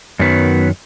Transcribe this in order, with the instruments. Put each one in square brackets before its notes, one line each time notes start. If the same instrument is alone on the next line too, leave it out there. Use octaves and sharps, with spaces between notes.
[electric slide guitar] F#2 D#3 F#3 B3